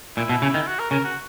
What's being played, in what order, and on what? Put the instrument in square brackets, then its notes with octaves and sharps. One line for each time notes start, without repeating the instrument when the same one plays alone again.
[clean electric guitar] A#2 [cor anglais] E4
[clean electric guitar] B2
C#3
D#3
[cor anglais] F#4
A#4
[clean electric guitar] C#3 [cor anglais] A#4
[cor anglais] F#4